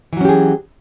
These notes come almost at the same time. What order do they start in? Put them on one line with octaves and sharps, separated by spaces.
E3 F#3 C#4 G4 G#4